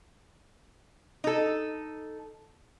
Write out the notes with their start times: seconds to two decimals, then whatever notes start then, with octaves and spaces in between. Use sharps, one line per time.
1.24 D#4 A4